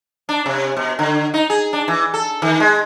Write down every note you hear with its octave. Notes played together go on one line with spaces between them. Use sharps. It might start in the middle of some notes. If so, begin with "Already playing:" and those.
D4
C3
B2
D3
D#4
G#4
D4
E3
A4
D#3
G#3